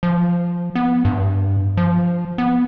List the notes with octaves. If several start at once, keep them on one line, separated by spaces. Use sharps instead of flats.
F3
B3
G2
F3
B3